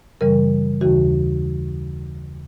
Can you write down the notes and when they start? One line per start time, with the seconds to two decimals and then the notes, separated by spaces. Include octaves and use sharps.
0.21 F#2 C#3 E3 G3 A#4
0.81 D#2 C#3 E3 F#4